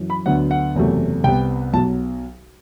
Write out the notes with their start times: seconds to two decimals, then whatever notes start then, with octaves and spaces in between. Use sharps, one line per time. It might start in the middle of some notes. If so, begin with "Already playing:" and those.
Already playing: F#2 E3
0.10 B5
0.26 D2 D3 F#3 B3 F#5
0.51 F#5
0.75 F#1 E2 C3 F#3 A3
1.24 C2 C3 G3 B3 G5
1.73 B1 B2 F#3 A5